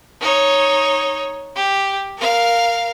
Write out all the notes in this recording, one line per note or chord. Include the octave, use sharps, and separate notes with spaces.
D#4 C#5
G4
A#4 F5